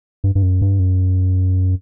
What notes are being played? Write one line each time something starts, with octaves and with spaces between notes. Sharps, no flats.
G2
G2
F#2
G2
F#2